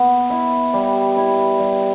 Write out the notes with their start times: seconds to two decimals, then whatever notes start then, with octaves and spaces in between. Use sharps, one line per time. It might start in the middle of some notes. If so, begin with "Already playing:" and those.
Already playing: B3
0.30 E4
0.74 G3
1.17 E4
1.59 G3